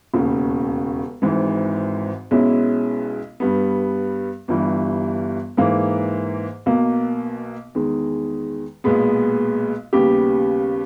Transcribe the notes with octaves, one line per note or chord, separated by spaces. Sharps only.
E1 D#2 C#3
G#1 G#2 E3
B1 B2 G#3 C#4 E4
G2 G3 B3
G1 G2 E3 G3
G#2 E3 A#3
B1 B2 A#3
E2 D#3 G#3
B1 A#2 G#3 B3
D#2 C#3 G3 B3 G4